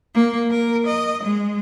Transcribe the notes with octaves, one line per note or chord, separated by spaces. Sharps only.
A#3
A#4
D#5
G#3